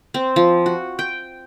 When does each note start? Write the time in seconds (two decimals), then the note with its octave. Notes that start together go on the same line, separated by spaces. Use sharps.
0.14 C4
0.36 F3
0.66 F#4
0.99 G5